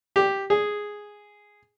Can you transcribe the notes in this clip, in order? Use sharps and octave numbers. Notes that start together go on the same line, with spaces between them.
G4
G#4